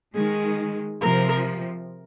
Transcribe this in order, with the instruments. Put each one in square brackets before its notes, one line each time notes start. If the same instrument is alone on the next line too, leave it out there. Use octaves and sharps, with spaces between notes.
[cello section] D#3 G#3 [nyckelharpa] G#4
[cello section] C3 F3 [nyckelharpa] A#4